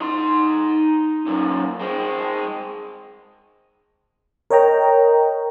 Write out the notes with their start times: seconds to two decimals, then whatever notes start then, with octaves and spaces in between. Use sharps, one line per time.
0.01 D#4 C6
1.26 F#2 A#2
1.81 G#3 C4
4.50 A#4 C#5 D#5 G5 A#5